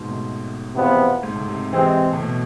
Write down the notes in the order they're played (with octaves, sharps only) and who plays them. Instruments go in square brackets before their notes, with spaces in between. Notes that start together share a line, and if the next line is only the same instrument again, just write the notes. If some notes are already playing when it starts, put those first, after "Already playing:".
Already playing: [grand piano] G#2 B2
A2
[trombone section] E2 C3 F3 B3
[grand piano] G#2
A2
C3
[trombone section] C3 G#3 C4 [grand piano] E3
[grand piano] A2
B2